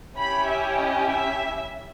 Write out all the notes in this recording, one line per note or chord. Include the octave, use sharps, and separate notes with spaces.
C#4 E4 G4 B5
E5
D#5
E5